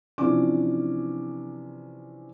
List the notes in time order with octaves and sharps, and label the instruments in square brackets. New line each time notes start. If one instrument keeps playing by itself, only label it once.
[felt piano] C3 E3 F3 C#4 D4 D6